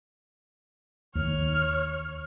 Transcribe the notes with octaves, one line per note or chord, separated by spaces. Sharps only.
D#2 D#3 C#5 F6